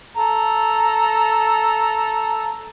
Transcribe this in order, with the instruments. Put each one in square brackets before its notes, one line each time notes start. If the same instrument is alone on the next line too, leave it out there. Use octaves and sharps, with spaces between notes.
[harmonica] A4 A#5